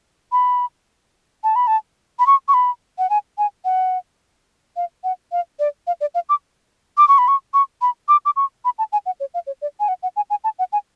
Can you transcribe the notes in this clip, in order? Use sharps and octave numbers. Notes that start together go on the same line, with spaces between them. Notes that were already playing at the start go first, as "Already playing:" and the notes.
B5
A5
B5
A5
B5
C#6
C#6
B5
F#5
G#5
G#5
F#5
F5
F#5
F5
D5
F5
D5
F5
D6
D6
C#6
B5
C#6
C#6
B5
D6
D6
C#6
B5
A5
G#5
F#5
C#5
F5
C#5
D5
G#5
F#5
F#5
G#5
G#5
A5
F#5
G#5